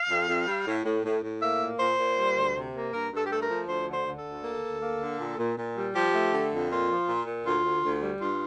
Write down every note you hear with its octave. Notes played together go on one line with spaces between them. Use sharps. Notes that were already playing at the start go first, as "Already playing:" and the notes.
Already playing: F5
F2
F2
G3
A2
A2
A2
A2
A#3 E5
A#2
A#2 C5
A#2
G3
D2
C3
A#3
G2 A#4
G2
A4
G4
A3 A4
A#4
F3
D2 C5
D3
C5
D3
A4
D2
A#3
D2
A#3
D3
A#2
A#2
A#2
G3
F3 G4
A3
D3
F2
A#2 F4
F3
A#2
A#2
D2 F4
D2
D2
G3
G2 F4